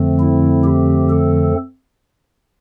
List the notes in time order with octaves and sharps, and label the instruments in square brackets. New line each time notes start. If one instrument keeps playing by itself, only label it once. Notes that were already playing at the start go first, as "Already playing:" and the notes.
Already playing: [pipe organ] F2 D3 F3 A3 C4
E4
G4
A4